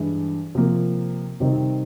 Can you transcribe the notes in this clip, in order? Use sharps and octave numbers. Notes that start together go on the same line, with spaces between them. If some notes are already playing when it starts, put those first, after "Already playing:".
Already playing: G2 E3 G#3
C3 F3 A#3
C3 D#3 G3 C4 D#4